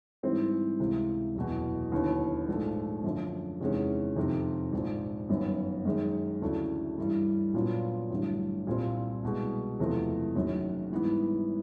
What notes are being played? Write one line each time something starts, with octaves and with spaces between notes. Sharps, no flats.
G#2 E3 G3 C4
C#2 C3 E3
F#1 E2 B2
D#2 D3 F#3 B3 E4
A#1 G#2 F3 A3
F#2 D3 F3
E2 C3 D#3 G#3 C#4
F2 C3 D#3
A#1 G#2 F3
G1 F#2 D#3 F#3 B3
F#2 D#3 G#3
D2 C#3 E3 A3 D4
G2 E3 G3
A#2 F#3 B3 D4 F4
A1 G2 D3 F#3
C2 A#2 G3 C4 F4
C2 B2 G#3
F#1 E2 C3 F3 A3
F#1 F#2 D#3 F#3
G#2 E3 G3 B3